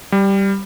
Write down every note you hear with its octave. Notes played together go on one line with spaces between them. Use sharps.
G3